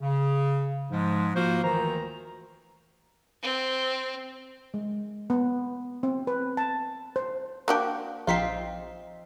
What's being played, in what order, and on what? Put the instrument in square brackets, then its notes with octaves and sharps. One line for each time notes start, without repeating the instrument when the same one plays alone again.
[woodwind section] C#3
G#2 F3 G#3
F3 A#3 F4 F#4 C5
D2 D#3 E3 A#5
[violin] C4
[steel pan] G#3
B3
C4
B4
A5
C5
[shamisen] A#3 D4 G4 [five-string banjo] F#4
[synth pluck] A#1 B6 C7 [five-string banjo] C4 D#4 F4